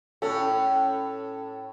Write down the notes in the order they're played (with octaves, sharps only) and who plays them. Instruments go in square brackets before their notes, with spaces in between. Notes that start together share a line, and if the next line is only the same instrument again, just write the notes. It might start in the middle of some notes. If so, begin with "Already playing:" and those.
[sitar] A2 C#4 [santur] A4